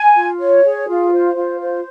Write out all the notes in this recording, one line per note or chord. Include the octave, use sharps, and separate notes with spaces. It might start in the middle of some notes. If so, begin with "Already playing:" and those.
Already playing: G#5
F4
C#5
G#4
F4
C5
F4
C5